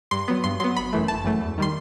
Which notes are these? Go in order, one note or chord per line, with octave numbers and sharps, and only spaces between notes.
G2 C6
F#3 B3
G2 C6
F#3 B3 C6
G1 B5
F#2 E3 A3
G1 A5
F#2 E3 A3
E2
D#3 G3 C6